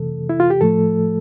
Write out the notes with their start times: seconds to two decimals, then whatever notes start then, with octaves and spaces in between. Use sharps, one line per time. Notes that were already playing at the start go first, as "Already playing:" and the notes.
Already playing: F2 C3 E3 A3 A4
0.29 E4
0.40 F4
0.50 G4
0.61 A2 F3 A3 A4